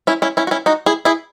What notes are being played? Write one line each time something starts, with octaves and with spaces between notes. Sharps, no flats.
C#4 E4
C#4 E4
C#4 E4
F#4
C#4 E4
D#4 F#4
E4 G#4
E4 G#4